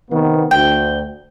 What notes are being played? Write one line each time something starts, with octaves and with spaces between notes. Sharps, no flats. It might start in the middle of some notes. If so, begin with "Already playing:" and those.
C3 D#3 B3
D2 G5